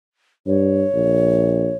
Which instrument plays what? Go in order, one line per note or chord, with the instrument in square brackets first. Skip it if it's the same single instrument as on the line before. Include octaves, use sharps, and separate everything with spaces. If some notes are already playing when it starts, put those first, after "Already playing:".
[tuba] G2 [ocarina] C#5
[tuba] A#1